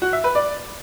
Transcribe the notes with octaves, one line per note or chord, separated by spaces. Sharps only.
F#4
E5
B4
D5